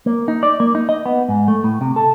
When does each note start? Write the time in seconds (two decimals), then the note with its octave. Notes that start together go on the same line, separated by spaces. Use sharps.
0.06 A#3
0.28 D#4
0.43 D5
0.60 A#3
0.75 D#4
0.89 D#5
1.06 B3
1.29 G#2
1.48 A3
1.64 A2
1.81 C3
1.96 A4